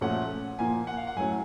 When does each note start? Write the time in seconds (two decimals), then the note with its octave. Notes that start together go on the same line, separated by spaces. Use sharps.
0.01 A#2 F3 A3 C#4 F#5
0.59 A#2 F3 A#3 G#5
0.87 F#5
0.97 F5
1.07 F#5
1.16 A2 F#3 A3 C#4 G#5